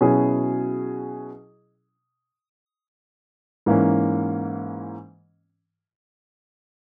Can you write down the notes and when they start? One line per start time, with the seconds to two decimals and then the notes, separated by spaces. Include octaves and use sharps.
0.01 B2 F#3 C#4 E4 G#4
3.66 G#2 E3 A#3 C#4